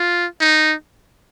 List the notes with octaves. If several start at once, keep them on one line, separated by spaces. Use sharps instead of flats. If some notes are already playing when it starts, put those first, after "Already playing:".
Already playing: F4
D#4